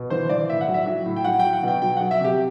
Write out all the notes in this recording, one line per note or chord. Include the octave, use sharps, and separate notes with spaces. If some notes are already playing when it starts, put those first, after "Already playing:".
Already playing: B2
E3 C5
E3 D5
A2 E5
F#5
F#3
E5
F#3
A2
G5
F#3 F#5
F#3 G5
F#5
B2 G5
F#3 G5
F#3 F#5
E5
C3 G4